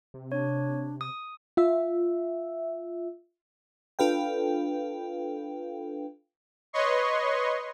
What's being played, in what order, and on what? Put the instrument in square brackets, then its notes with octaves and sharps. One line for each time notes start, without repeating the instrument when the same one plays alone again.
[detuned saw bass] C3
[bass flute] D4 [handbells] C#5
[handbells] D#6
[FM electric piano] F4 E5
D4 F4 A4 B4 F5 G5
[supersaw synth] B4 C#5 D#5 C6 C#6